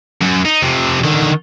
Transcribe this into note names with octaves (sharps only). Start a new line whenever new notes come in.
F#2
D#4
F2 C3
D3 D#3